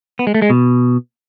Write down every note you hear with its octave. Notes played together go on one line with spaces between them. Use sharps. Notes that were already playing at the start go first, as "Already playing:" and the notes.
B3
G#3
A3
G#3
B2